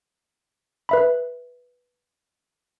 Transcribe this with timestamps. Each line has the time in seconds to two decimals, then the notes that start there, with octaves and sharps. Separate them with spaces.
0.89 B4 E5 B5